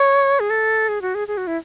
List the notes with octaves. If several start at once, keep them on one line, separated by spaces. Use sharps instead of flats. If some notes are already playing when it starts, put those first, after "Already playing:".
Already playing: C#5
G#4
A4
G#4
F#4
G#4
G#4
F#4
E4